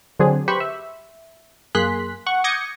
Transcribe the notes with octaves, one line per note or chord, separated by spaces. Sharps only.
D3 F#3 C4 D4 G#4
G4 B4 C5 B5 C#6
E5
F#2 A#3 G#4 C6 F#6 B6
F#5 C#6
D6 D#6 G6 G#6 A#6 C#7